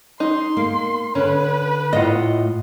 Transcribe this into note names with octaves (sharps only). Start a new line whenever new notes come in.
D#4 C6
A#3
D3 C#4 B4
A2 F4 D#5 F#5